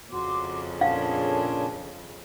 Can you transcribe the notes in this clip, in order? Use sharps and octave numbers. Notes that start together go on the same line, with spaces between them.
F2 C#3 F#4 C6 D6
A#2 C#4 D4 G#4 A4 C#5 F5